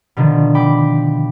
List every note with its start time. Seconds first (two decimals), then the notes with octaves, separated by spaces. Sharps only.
0.17 B2 D3 D#3 F3
0.55 G5 B5 D6